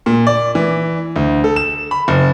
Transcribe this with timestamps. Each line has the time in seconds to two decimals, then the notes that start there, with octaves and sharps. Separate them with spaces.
0.06 A#2
0.27 D5
0.55 E3
1.16 D2
1.44 A4
1.56 E7
1.91 B5
2.08 F#1